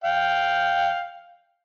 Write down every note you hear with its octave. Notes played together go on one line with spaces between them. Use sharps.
F5 G5